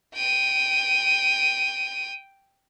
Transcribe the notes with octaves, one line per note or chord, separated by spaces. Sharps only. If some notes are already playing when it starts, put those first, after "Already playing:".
G5 D#7